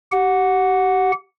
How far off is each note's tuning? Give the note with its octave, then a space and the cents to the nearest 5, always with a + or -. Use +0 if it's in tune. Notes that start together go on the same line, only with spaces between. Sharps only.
G4 -30 F#5 -10